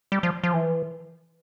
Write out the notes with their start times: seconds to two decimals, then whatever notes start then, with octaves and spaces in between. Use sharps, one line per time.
0.12 G3
0.23 F3
0.44 F3
0.54 E3